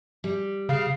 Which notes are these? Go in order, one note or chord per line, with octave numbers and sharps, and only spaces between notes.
G3
C#3 F5